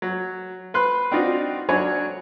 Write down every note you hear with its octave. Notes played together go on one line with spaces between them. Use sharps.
F#3
B4 C6 F#6
C4 D4 D#4 F4 F#4
F#3 D4 C#5 G#5